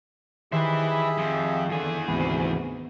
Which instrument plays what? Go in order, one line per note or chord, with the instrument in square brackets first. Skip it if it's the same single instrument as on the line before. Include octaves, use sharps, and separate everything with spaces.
[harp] D#3 C5 [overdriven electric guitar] E4 B4 [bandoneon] G4 G#4 E5
[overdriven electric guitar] F2 F3
[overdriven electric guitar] E2 G#4 [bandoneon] D3
[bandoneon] D2 G#2 C3 [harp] B3